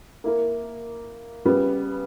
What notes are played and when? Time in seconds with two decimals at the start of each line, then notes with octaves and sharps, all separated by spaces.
0.24 A#3 E4 A#4
1.45 C#3 G3 B3